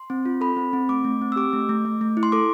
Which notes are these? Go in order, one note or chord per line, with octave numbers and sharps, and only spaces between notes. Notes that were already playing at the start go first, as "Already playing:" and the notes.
Already playing: C6
C4
F4
A4 B5
C4
C4
A3 D6
A3
C4
E6
G4 D6
A3
A3
A3
A3
E4
C6
A4 D6